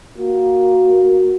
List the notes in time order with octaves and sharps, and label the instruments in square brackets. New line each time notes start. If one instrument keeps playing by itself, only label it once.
[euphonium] A#3 [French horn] F#4